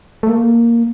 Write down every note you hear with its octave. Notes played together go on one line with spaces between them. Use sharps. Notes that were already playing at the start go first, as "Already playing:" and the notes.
A3
A#3